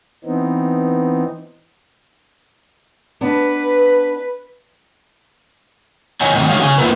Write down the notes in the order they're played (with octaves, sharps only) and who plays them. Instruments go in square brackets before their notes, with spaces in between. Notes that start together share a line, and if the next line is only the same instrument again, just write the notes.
[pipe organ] E3 B3 C4 D#4
[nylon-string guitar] B3 D4 [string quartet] B4
[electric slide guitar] D#3 C#5 D#5 G#5
D#3 G#3 A3
D3 D#3 A3 F#4 C#5 F5
C#3 G#4 G#5
A3 A#3 F4 A#4 B4